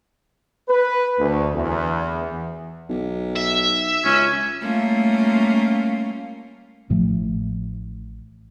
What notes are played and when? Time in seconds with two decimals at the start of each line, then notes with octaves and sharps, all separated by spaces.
0.69 B4
1.19 D2
1.54 E2
2.89 B1
3.36 E5
4.05 C#2 C#4
4.62 G3 A3 A#3 C#4 F4
6.90 A1 A2 F3 A3